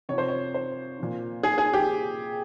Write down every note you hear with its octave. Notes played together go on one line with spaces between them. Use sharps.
C3 F3 C5 C#5
C#5
C5
A#2 F3
G#4
G#4
G4